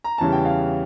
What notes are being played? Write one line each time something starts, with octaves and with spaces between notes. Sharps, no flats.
A#5
E2 C#3 E3 G3 A5
G5
F5